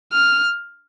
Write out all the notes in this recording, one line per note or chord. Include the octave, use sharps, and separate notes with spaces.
F6